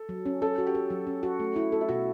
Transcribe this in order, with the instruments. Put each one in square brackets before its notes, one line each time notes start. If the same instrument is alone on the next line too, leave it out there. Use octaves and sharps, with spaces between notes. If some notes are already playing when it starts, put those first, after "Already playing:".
Already playing: [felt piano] A4
[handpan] F#3
C#4
[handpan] C#4 [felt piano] A4
[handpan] F#4
[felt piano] G4
[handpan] A4
F#3
C#4
F#4
A3
E4
A4
[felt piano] E4
[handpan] B2 [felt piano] F#4